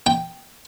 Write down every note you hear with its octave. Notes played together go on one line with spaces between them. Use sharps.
G5